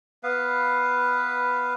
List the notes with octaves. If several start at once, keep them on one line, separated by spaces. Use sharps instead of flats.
B3 B4 F5